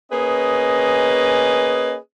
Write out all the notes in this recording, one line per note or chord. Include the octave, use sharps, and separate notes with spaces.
A#3 C#4 G#4 B4 D#5